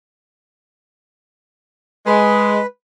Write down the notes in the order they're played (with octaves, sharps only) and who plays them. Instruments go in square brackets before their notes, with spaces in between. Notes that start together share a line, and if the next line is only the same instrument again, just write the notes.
[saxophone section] G#3 [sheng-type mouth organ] B4